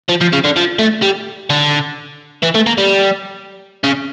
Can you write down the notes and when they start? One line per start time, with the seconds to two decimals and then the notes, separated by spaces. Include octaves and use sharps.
0.09 F3
0.21 F3
0.33 C#3
0.44 D3
0.56 F3
0.79 A3
1.02 G3
1.50 D3
2.43 E3
2.55 A3
2.67 A#3
2.78 G3
3.84 C#3